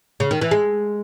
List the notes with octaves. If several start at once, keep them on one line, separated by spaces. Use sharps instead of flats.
C#3
D#3
E3
G#3